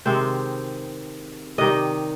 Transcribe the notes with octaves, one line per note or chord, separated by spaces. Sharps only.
C3 D#3 G#3 C4 C5
C3 D#3 G3 D#5